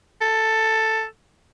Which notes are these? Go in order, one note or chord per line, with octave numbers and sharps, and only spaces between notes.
A4